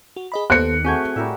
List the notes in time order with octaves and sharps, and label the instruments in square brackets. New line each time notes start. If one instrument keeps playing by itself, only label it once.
[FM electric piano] F#4
G#4 D#5 B5
[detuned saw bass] D#2 [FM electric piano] B3 A4 C5 [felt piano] F#6 C#7
[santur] A3 F#4 G#4 [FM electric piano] C4 G6 G#6
[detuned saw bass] A2 [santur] G3 A#4 E5